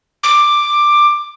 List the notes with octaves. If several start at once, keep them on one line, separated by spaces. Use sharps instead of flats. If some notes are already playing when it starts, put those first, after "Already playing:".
D6